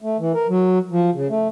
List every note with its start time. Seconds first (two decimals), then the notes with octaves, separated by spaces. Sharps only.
0.02 A3
0.19 E3
0.34 A#4
0.49 F#3
0.91 F3
1.14 C#3
1.30 A3